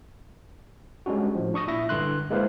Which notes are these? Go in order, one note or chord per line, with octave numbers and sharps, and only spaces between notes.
G3 G#3 C#4 D4 F#4
A2 F3
D4 C#6 D#6 A#6
A#2 E4 E5 A#6
G2 D3 C6 F#6
G#3 A#3 E4 B4 C5 F5